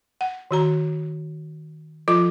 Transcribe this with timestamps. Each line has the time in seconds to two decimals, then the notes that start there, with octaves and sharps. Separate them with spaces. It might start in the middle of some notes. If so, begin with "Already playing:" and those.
0.21 F#5
0.51 D#3 F#4 A#5
2.08 F3 F4 A4 D6